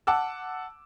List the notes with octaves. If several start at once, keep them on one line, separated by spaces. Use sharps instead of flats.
F#5 A5 D6 E6